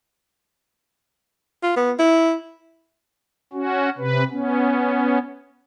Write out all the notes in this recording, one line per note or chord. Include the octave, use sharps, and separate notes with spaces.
F4
B3
E4
C#4 F#4
C3 B4
B3 C#4